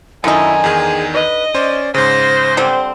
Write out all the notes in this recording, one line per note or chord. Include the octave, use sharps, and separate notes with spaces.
F#2 D3 D#3 D#4 E4 G#5
E2 D#3 G#4
B4 D#5
C#4 C5 D5
G#2 C#3 C5 A#6
D3 G3 C4